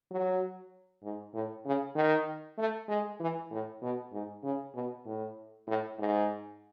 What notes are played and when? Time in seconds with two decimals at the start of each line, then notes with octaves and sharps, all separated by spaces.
0.11 F#3
1.03 G#2
1.34 A2
1.65 C#3
1.96 D#3
2.58 A3
2.88 G#3
3.20 E3
3.51 A2
3.82 B2
4.12 G#2
4.43 C#3
4.75 B2
5.05 A2
5.67 A2
5.98 G#2